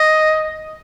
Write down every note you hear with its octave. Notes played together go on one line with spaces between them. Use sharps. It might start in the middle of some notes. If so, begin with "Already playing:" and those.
Already playing: D#5